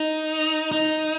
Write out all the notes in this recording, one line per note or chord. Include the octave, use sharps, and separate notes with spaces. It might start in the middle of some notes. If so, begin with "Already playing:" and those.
Already playing: D#4
D#4